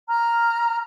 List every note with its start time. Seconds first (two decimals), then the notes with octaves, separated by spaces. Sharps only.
0.08 A#5 F6